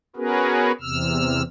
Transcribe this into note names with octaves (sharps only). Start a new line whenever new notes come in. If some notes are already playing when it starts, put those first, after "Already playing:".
B3 C#4 F#4 G#4 A#4 B4
E2 C3 E6 F6